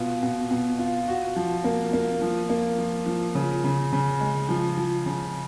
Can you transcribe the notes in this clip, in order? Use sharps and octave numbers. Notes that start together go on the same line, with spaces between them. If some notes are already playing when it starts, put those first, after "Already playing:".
Already playing: B2 F4
B2
B2
F4
F#4
F3
A#3
A#3
F3
A#3
F3
F3
C#3
C#3
C#3
G#3
F3
F3
C#3